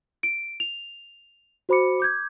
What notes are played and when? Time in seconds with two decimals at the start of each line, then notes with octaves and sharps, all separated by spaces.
0.23 D7
0.60 F7
1.69 F#4 C5 B5 D6 C#7
2.00 D6 G6 G#6